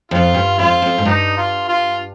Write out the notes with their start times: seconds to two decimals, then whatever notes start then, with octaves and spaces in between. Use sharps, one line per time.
0.11 F2 F4
0.34 G2
0.58 F2 F4
0.82 F2
0.98 G#2
1.05 G2 D#4
1.37 F4
1.68 F4